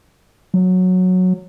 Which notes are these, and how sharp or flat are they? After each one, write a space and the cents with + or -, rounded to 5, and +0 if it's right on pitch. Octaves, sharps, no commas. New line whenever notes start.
F#3 -10